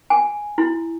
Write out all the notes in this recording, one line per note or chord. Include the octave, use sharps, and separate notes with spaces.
G#5
E4